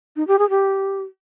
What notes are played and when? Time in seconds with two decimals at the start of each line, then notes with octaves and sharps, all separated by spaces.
0.16 D#4
0.27 G4
0.39 G#4
0.50 G4